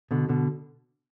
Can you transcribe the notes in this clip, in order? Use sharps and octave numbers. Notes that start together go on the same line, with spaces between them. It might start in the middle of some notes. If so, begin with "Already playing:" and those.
B2 D3
B2 D3